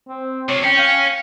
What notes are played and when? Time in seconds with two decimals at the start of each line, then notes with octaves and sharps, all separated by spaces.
0.08 C4
0.49 C3 F4 C#5
0.64 C#4 G5
0.79 F5